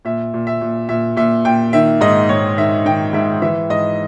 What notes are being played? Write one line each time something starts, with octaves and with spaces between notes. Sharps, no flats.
A#2 E5
A#2
E5
A#2
A#2 E5
A#2 E5
A#2 G5
D#3 E5
G#2 D#5
G#2 C#5
D#3 E5
D#3 G5
G#2 E5
E3 E5
G#2 D#5